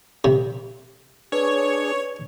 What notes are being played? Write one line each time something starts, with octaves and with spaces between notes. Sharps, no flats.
C3
D4 G#4 B4 C#5